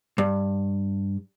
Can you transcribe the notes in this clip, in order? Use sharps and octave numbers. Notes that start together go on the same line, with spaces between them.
G2